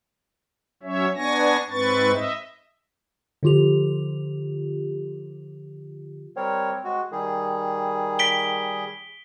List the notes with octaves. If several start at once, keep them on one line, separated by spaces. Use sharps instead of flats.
F#3 C#4 C#5 E5
B3 D4 G#5 C#6 A#6
G#2 C4 B4 C#6 A6
D#5 E5
D3 F3 F4 G4 F7
G3 C4 A#4 C#5
G#3 F#4
D#3 G3 G#4
B6 D7 G7